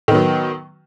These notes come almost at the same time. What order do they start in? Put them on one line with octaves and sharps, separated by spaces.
D#3 B3 F#3